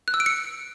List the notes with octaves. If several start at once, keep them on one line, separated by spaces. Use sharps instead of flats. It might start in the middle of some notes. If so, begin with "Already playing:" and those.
F#6
E6
D7
C#7